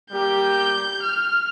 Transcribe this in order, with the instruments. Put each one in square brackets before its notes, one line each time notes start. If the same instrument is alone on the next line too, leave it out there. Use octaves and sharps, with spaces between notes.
[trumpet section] G3 A#3 G4 [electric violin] G6
[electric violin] F6